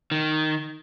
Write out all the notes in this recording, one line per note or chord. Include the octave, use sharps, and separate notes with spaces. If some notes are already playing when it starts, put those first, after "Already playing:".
D#3